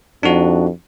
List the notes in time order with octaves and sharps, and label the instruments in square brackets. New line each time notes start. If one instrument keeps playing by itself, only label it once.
[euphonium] F2 [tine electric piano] D4 D#4 F#4